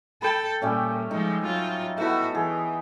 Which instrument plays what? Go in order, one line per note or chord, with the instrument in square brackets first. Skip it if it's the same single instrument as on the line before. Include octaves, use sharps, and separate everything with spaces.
[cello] A4 [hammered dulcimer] G5 B5
[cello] A#2 [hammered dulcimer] G3 A3 C#4
[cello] F3 G#3 [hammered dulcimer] D#4
[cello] F#3 F4
[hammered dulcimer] A3 B3 A4 [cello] E4 F#4
[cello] E3 [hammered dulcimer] G#4